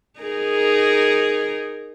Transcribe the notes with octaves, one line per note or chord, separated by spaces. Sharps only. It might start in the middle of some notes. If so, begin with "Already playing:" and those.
D#4 G#4 A#4